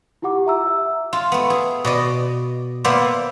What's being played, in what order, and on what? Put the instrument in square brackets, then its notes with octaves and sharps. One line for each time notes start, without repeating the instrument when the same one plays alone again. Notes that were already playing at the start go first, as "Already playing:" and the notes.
[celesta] E4 F4 G4 F#5 D6
E5 A#5 E6
E5
[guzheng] F4
A3 B3
G#4
B2 D5 D#5
A#3 B3 A#4 C5 D5 E5